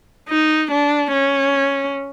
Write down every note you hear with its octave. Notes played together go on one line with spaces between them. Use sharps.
D#4
D4
C#4